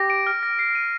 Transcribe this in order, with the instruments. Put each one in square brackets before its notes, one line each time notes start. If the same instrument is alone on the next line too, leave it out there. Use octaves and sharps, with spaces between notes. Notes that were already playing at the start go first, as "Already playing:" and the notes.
Already playing: [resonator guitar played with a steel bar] G4 [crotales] A#6
[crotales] D7
F6
A#6
C7
D#7